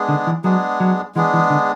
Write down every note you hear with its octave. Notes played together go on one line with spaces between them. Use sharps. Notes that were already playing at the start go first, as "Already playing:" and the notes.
Already playing: G#3 B3 D4 G#4
D3
E3
F#3 G#3 B3 D4 G#4
F#3
E3 G#3 B3 D4 G#4
E3
D3